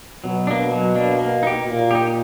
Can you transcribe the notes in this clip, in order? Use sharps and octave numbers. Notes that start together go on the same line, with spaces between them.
B2 F#3
A#3 D4
F#3
A#3 D4
A#3
D#4 G4
A#2 A#3
D#4 G4